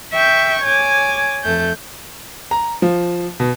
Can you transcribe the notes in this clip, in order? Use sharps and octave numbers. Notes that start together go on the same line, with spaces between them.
E5 G5 C#6 G6
C#5 G#5 D6
F2 A3 G6
A#5
F3
B2